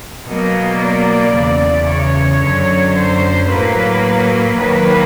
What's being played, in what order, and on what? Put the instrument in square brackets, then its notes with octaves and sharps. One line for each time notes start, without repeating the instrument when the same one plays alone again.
[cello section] B2 F#3 A#3 D#5
D5
E2 C#3 E3
C#5
F#2 D3 F#3
C5
A2 F#3 A#3 B4
D#2 D#3 F#3 A#3 B4